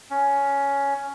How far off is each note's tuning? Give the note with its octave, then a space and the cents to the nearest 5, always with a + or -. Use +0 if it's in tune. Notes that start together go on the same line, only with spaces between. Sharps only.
C#4 +10